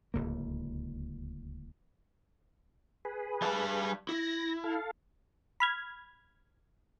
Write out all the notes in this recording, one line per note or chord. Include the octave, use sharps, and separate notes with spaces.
D1 C#2 A#3
G#4 B4
G3 A5
E4 A#6
A4 F5
B5 F6 G#6